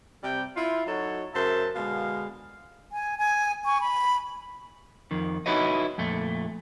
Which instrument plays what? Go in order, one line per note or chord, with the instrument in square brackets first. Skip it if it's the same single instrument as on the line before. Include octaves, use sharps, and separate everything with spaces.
[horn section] C3 G3 G5
E4 F4
F#3 D#4 F#4 A4 C#5
F#2 C#3 A#4 C5 E5 A5
B2 D3 G#3 F5
[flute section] G#5
G#5
G#5 C#6
B5
[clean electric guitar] F2 D#3
D#4 E4 F#4 B4 C#5 D#5
F2 A#2 A3